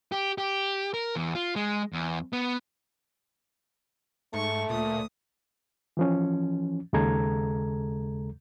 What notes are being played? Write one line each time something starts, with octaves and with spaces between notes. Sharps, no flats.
G4
G4
A#4
E2
F4
G#3
E2
B3
G#2 A3 C#6
D2 A#2 D#6
E3 F3 C#4
D#2 C#3 G#3 A4 A#5 G#6